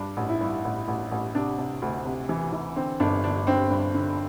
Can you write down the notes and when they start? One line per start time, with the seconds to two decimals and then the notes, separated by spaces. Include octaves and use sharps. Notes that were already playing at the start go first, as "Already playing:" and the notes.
Already playing: G2 D4
0.17 A1
0.29 E4
0.41 G2
0.65 A1
0.88 A1
1.11 A1
1.35 C3 D4
1.58 C3
1.82 D2
2.05 C3
2.29 E3
2.53 E3
2.76 D3 C4
3.00 G1 D4
3.24 D3 D4
3.47 D3 C4
3.70 G2
3.94 D3